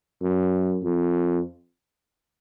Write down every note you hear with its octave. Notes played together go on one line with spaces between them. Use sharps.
F#2
F2